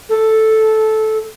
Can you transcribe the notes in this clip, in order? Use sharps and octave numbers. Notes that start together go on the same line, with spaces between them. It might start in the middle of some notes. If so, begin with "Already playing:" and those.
A4